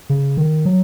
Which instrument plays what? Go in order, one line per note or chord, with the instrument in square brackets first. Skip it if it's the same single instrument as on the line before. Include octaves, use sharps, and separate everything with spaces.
[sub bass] C#3
D#3
F#3